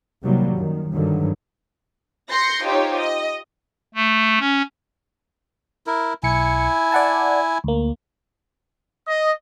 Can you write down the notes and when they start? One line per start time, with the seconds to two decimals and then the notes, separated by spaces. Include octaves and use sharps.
0.22 C3 D#3 F#3 G3 A#3
0.55 F#2 D#3
0.92 G2 D3 D#3 F#3
2.30 C6 G6 A#6 C7 C#7
2.66 D#4 F4 G4 C5 C#5
2.98 D#5
3.95 A3
4.39 C#4
5.87 E4 A#4
6.23 B1 E4 G#5 C#7
6.92 D5 F#5 A5
7.64 D2 A#3
9.07 D#5